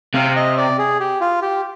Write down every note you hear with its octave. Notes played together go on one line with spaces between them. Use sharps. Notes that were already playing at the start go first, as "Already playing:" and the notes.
C3 F5
D#5
D5
G#4
G4
F4
G4